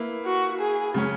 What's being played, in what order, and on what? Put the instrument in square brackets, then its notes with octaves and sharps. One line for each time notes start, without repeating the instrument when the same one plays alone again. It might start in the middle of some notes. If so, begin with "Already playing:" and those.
Already playing: [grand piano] A#3 E4 B4
[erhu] F#4
G#4
[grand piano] C#3 F#3 C#4